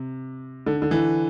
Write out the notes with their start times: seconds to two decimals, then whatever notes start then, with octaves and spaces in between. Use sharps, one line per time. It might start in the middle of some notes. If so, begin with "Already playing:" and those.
Already playing: C3
0.67 D3
0.82 D3
0.91 E3